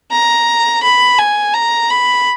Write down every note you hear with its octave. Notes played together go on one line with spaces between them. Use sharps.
A#5
B5
G#5
A#5
B5